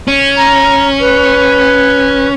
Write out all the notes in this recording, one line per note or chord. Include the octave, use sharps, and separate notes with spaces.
C#4
A#5
B4